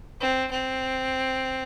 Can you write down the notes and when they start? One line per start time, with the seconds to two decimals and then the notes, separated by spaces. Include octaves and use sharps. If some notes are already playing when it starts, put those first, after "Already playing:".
0.21 C4
0.51 C4